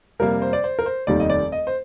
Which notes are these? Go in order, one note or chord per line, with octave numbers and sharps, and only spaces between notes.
F2 C3 G3 A#3 A#4
C5
D5
C5
A#4
C5
F1 D#2 D#3 G3 D5
D#5
D5
D#5
C5